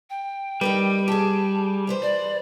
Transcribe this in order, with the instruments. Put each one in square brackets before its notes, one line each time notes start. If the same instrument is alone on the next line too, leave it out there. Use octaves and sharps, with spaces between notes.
[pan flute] G5
[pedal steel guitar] G3 [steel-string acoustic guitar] D#4 A#4 B4
[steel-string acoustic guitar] G4 G#4 [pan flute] A5
[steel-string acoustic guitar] E3 B4 C5
[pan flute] D5